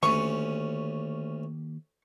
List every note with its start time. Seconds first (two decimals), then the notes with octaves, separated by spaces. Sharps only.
0.03 D2 D#3 A#3 C#4 G4 C#6